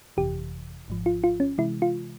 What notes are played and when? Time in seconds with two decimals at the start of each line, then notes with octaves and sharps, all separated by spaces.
0.17 G1 F2 C3 E3 G4
0.88 G#1 G#2 F3
1.06 F4
1.24 F4
1.40 C#4
1.58 C3 E3 G#3 E4
1.82 F4